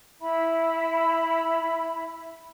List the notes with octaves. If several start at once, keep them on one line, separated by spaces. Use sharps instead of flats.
E4 E5 B5